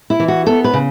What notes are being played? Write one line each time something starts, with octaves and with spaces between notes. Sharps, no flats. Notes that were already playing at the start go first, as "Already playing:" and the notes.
E4
E3
F#4
B3 A4
B4
C#3